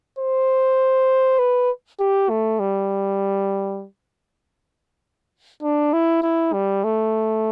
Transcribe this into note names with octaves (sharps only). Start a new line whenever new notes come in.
C5
B4
G4
A3
G3
D4
E4
E4
G3
A3